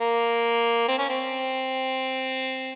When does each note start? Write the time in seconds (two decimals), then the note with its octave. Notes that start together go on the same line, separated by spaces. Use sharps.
0.01 A#3
0.88 C4
0.98 C#4
1.09 C4